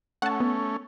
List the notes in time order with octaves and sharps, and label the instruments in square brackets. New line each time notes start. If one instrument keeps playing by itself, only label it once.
[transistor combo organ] A3 C#4 [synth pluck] F#5 A5
[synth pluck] B3